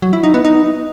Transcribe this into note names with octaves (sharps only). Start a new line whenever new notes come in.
F#3
E4
D#4
B3
D#4